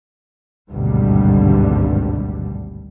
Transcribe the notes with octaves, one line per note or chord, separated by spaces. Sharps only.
G#1 D2 G2 B2 D3 G3